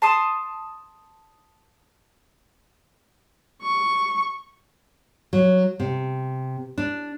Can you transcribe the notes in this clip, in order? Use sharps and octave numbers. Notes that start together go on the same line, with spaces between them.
A5 C6 D#6
C#6
F#3
C3
D4